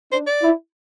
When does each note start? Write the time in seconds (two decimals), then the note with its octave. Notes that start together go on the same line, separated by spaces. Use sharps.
0.12 D4 C5
0.27 D5
0.42 E4